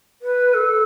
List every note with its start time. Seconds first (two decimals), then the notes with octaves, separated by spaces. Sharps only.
0.22 B4
0.54 A4